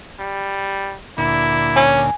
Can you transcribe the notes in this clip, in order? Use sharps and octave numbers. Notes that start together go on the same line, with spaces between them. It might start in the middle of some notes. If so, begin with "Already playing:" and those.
G3
D2 A#2 E4
C#4 G#5